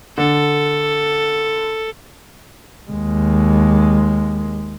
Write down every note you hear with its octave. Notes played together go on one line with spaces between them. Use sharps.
D3 A4
D#2 G#3